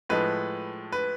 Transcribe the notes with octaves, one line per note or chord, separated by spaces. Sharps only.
A2 F3 G#3 B4
B4